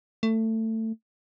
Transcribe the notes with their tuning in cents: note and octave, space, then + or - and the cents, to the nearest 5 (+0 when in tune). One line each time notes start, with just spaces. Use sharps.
A3 +20